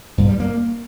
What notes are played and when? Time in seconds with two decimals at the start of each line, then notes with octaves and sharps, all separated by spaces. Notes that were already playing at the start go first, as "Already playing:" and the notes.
0.18 G2
0.29 G3
0.40 A#3